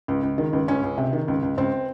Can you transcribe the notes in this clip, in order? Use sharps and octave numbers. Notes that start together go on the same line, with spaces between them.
C#2
C#2
D#3
C#2
C#2 C#4
C#2
C3
D#3
C#2
C#2
C#2 C4